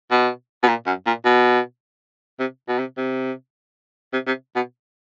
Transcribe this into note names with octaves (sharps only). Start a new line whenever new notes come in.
B2
B2
A#2
F#2
A#2
B2
C3
B2
C3
C3
C3
C3
B2